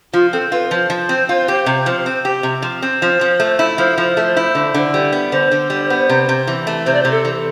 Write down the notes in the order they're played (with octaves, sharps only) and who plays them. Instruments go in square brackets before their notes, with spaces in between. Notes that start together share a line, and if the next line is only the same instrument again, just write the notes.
[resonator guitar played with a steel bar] F3 [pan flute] F4
[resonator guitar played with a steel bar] C4 [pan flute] A4
[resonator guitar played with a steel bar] F4 [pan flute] B4
[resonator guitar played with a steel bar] F3 [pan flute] C5
[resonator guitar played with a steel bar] F3
C4
F4
G4
C3
F3
C4
G4
C3
F3
C4
[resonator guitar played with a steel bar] F3 [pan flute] C5
[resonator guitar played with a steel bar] F3
A3
E4
[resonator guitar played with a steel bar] F3 [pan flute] C5
[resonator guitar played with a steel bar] F3
A3
E4
D3
D3
G3
B3
[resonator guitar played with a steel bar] D3 [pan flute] C5
[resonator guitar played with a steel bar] D3
G3
B3
C3
C3
E3
A3
[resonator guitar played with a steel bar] C3 [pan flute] C5
[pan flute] D5
[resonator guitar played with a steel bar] C3 [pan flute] C5
[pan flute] A4
[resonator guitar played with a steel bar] E3